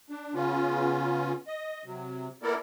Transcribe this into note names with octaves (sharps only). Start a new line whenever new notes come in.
D4
C#3 B3 C#4 F4
D#5
C3 F#3
A#3 B3 E4 A4 A#4 D5